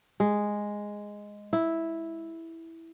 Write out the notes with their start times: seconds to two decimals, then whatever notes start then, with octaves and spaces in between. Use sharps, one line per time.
0.20 G#3
1.53 E4